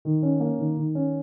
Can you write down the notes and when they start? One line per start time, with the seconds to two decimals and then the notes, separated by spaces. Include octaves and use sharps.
0.05 D#3
0.23 C#4
0.40 A#3
0.59 D#3
0.77 D#3
0.95 C#4